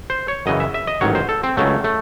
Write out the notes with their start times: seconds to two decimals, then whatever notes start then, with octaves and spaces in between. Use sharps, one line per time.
0.10 C5
0.28 C#5
0.46 F#2 C#3 E3 D#5
0.60 E5
0.74 E5
0.87 D#5
1.01 A1 G#2 D#3 F#3 C#5
1.15 C5
1.29 A4
1.43 C4
1.57 C#2 C#3 F#3 A3
1.84 A3